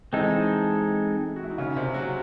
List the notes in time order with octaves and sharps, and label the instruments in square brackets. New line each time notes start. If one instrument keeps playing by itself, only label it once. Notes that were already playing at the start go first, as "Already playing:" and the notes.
[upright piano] E3 E4 [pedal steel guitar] G#3 C4 D#4 A4
[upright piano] F#4
E4
D#4
C#3 C#4
C3 C4
F#3 F#4